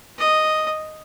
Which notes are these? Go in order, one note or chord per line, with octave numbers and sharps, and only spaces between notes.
D#5